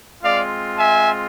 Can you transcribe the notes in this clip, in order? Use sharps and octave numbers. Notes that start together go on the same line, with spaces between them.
G#3 C4 F4 D5 F5
E5 G#5